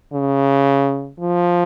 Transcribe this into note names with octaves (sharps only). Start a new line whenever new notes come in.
C#3
F3